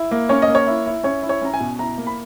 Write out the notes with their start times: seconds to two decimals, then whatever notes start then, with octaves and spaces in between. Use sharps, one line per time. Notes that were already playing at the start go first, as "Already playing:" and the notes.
Already playing: E4
0.11 A#3
0.29 C#4 C#5
0.42 D#5
0.48 A#3
0.55 C#5
0.67 E4
0.86 E4
1.04 C#4 C#5
1.22 E4
1.29 C#5
1.42 C#4 A#5
1.54 G#5
1.60 B2
1.79 E4 A#5
1.97 A#3
2.07 B5